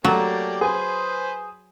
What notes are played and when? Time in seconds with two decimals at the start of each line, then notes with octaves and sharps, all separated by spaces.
0.05 F#3 A3 A#3 G4 D5 A#5
0.61 G#4 B4 C5 G#5